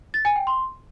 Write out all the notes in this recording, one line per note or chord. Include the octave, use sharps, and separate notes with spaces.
A6
G#5
G5
C6